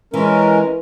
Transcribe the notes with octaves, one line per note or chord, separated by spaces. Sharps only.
E3 G#3 C#4 A#4